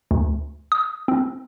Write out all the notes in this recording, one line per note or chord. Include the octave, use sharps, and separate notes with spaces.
D2
D#6
C4